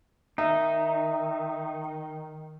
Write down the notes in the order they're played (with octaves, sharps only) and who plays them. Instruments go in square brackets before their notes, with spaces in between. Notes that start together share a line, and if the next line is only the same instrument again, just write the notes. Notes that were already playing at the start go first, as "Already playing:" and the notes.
[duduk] D#3 [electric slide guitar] D#4 [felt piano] E5